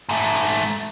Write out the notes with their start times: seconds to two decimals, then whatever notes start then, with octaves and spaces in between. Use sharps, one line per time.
0.09 G#2 A3